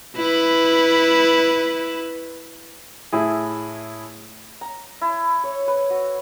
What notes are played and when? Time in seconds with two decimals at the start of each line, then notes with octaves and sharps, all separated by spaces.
0.17 E4 B4
3.12 A2 E4 G#4
4.61 A#5
5.01 E4
5.44 C#5
5.68 B4
5.90 F#4